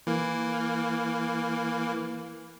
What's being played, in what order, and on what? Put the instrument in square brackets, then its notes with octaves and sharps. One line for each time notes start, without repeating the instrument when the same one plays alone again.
[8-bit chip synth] E3 A#3